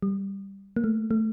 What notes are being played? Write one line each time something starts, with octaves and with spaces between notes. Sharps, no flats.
G3
A#3
A3
A3